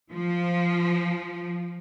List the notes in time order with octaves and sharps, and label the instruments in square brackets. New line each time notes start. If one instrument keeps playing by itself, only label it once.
[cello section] F3